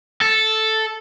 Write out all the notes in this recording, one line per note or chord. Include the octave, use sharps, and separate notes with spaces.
A4